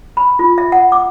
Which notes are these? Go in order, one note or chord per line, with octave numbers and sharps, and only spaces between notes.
B5
F4
E5
F#5
D6